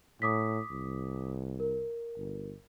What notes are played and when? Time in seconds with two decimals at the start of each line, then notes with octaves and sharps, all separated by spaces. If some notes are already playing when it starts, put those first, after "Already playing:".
0.22 A2 D6 D#6 B6
0.71 C2
1.60 A#4
2.18 G1